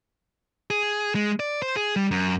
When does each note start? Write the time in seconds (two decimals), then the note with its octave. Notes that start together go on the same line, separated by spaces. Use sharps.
0.70 G#4
1.15 G#3
1.40 D5
1.62 C5
1.76 G#4
1.96 G3
2.11 F#2